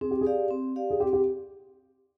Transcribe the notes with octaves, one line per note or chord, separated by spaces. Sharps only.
C4 G#4
G4
G#4
G4 D5 F5
C4
G4 D5 F5
G#4
C4 G4
G4